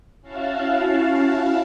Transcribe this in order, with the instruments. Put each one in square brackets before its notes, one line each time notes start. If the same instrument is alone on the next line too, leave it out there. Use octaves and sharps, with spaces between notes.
[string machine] C#4 E4 F#4 F5 A5